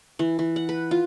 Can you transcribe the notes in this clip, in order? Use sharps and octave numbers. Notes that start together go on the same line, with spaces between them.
E3
E3
F#5
B4
F4